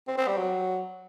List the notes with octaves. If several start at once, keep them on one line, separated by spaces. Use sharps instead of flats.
C4
C4
G3
F#3